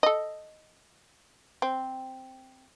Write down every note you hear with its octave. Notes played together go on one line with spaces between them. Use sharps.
A4 D#5
C4